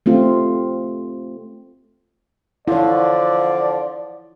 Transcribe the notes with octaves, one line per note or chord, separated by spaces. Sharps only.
A3 C4 F4
D3 F3 E4 C#5 D5